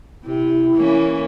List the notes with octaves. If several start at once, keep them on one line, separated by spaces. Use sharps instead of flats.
C3 E4
E3 A#3 C#4